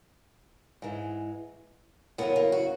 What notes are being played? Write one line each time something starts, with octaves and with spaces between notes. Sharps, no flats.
G#2 E3 G#3
E2 C#3 F#3 A#3 B3
A#3
F#4